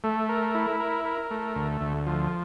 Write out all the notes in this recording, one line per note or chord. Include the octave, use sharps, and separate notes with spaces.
A3
A#4
E4
A#4
A#4
A3
D2
D2
F3